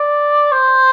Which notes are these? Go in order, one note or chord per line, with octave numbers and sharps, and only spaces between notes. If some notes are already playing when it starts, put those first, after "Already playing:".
Already playing: D5
C5